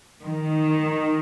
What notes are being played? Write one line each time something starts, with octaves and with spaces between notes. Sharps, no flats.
D#3